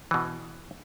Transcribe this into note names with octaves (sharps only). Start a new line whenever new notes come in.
B2 E3